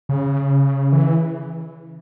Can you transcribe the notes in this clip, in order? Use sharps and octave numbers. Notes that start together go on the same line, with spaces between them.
C#3
E3